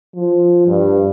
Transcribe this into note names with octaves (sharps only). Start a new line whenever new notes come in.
F3
G2